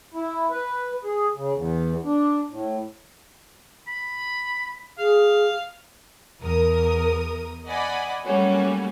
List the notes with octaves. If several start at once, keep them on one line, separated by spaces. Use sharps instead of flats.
E4
B4
G#4
C#3
E2
D4
A2
B5
G#4 F5
E2 A#4 D#6
D5 D#5 F#5 G#5 B5
F#3 G3 A3 A#3 C#4 F#4